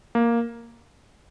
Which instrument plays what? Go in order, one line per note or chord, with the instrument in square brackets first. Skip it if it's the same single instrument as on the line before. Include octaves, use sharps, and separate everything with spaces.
[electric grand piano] A#3